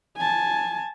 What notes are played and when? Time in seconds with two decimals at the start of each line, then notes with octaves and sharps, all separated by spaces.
0.17 G#5 A5